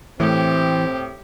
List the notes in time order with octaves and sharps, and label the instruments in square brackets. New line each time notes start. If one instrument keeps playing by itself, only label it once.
[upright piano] A2 [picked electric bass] E3 [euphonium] C4 [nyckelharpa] G4